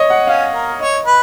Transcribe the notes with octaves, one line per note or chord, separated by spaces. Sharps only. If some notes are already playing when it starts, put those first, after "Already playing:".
Already playing: C#5 D#5
F#5
C#4 F5
A#4
C#5 D#5
B4